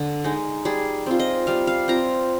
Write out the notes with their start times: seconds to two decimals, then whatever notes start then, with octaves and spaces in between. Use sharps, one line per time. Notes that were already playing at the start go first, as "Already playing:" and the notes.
Already playing: D3
0.24 G#3 D#4
0.65 G3 G#4
1.06 C4 F4
1.19 D#5
1.47 G3 F5
1.67 F5
1.88 C4 F4 A#5